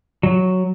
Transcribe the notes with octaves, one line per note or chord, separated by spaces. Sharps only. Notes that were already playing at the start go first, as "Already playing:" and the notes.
F#3